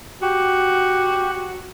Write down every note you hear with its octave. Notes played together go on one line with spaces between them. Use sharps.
F#4 G4